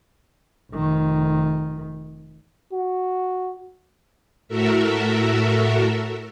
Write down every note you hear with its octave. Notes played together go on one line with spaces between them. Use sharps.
F1 D#3
F#4
A2 F#4 A4 A#4 E5